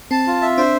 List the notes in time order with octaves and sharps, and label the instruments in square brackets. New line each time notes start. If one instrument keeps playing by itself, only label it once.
[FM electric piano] C4 [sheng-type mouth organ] A5
[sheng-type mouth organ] F4
E5
[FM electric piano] D4 [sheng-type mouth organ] C5